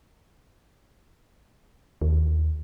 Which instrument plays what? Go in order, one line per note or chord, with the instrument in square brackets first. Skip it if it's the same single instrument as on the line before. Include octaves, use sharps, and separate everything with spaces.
[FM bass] D#2